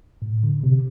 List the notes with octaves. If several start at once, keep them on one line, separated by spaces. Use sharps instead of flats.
A2
D3
C3